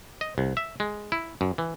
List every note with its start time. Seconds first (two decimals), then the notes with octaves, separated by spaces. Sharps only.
0.21 D#5
0.38 C2
0.57 E5
0.80 G#3
1.12 E4
1.41 F#2
1.58 E3